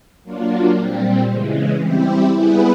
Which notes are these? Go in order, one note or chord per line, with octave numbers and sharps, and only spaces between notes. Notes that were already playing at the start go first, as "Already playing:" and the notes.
F#3 A#3 D4 F4
A#2 G3 C4
C#3 E3 G#3
G3 C4 E4 G4
G3 B3 E4 G#4 B4